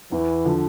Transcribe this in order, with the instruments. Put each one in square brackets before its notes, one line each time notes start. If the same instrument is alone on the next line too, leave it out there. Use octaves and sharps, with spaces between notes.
[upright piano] E2 [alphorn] E3
[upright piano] D3 F3